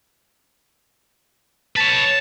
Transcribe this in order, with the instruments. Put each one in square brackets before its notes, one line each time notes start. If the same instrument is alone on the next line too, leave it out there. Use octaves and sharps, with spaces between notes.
[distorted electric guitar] B4 C#5 [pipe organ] A5